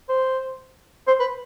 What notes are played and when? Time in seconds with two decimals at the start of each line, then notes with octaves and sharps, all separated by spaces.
0.09 C5
1.08 C5
1.20 B4